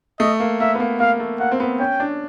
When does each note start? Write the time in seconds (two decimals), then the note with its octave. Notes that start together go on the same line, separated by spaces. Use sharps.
0.20 A3 D#5
0.40 A#3
0.60 A#3 E5
0.75 B3
0.80 A#3
1.00 A#3 F5
1.20 A3
1.40 A#3 F#5
1.52 C4
1.60 B3
1.80 C#4 G5
2.00 D4